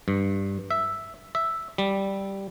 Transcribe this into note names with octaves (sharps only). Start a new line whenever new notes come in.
G2
E5
E5
G3